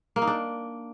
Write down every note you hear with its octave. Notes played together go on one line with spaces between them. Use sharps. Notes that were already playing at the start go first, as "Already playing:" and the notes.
A#3
D#4
D4